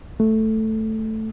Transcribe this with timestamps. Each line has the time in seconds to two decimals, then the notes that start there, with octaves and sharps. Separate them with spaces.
0.20 A3